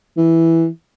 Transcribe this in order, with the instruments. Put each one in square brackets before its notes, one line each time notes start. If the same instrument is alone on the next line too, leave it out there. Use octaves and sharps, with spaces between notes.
[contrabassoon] E3